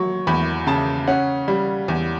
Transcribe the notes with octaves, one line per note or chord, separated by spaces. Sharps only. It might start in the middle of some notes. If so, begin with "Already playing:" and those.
Already playing: F#3 C#6
E2 B5
C#3 A5
C#4 F#5
G3
E2